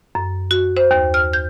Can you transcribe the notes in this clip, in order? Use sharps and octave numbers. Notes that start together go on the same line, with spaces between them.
F#2
F#4
C5
D#2
F6
G6